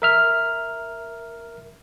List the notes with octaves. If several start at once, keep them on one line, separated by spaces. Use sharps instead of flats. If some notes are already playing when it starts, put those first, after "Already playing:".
A#4 E5 F6